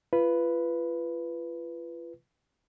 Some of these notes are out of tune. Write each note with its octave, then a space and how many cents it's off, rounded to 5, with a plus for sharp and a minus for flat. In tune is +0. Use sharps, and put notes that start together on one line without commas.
F4 -35 B4 +0